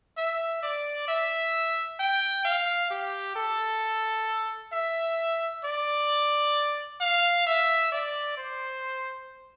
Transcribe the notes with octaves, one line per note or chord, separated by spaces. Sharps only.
E5
D5
E5
G5
F5
G4
A4
E5
D5
F5
E5
D5
C5